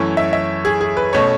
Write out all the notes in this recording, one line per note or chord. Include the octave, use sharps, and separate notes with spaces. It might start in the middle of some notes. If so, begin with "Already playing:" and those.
Already playing: F#2 E3 A3 C#4 C#5
E5
E5
G#4
G#4
B4
B2 A3 C#4 C#5